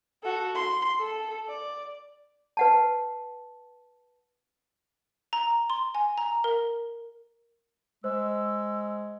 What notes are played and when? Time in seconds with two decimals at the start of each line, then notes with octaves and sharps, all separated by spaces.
0.23 F#4 A4
0.55 C6
1.00 A4
1.47 D5
2.57 B4 F#5 A5
5.33 A#5
5.70 C6
5.95 G#5
6.18 A#5
6.44 A#4
8.04 G#3 C5 E6